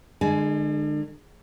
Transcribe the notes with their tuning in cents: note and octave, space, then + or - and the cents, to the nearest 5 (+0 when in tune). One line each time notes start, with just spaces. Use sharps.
D3 +40 G#3 +0 G#5 +30